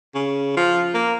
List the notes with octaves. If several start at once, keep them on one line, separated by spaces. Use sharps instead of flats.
C#3
F3
A#3